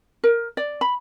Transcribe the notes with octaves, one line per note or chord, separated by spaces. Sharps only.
A#4
D5
B5